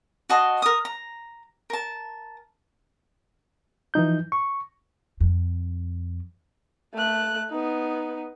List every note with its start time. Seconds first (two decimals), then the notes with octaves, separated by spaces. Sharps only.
0.29 F#4 D#5 A5 C6
0.62 A#4 D#6
0.85 A#5
1.70 A#4 A5
3.94 E3 F3 D#4 G6
4.32 C#6
5.21 F2
6.94 A3 F#6
7.50 B3 D#4